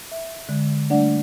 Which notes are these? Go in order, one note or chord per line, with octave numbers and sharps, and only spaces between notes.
E5
D3 G#3
G3 A3 D4 D5 F#5